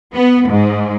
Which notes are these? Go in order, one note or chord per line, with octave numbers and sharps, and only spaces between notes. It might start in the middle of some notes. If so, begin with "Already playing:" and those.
B3
G#2